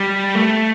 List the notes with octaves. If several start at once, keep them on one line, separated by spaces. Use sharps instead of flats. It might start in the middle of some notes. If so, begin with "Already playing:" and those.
Already playing: G3
A3